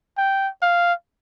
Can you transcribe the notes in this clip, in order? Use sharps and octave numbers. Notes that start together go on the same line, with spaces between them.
G5
F5